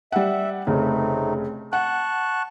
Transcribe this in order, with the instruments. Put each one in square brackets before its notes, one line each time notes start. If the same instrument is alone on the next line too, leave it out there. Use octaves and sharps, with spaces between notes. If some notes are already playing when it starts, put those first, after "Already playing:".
[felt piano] G3 F#5 [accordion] E5
[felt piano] F1 C#3 [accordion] A3 C4 D#4
[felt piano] F#5 [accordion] A5 C#6 F#6